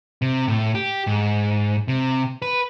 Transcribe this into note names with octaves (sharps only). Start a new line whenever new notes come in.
C3
A2
G4
G#2
C3
B4